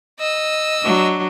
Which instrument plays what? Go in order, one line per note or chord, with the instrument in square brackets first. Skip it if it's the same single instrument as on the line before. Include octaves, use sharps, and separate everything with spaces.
[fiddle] D#5 E6
[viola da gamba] F#3 D4